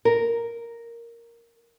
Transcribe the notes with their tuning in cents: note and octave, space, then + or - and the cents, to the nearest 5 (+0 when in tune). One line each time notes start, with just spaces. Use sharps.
A#4 +0